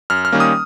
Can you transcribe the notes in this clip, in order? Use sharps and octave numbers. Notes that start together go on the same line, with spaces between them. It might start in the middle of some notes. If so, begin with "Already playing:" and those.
F#2 F6
F6
D#3 G3 A#3 C#4
D#6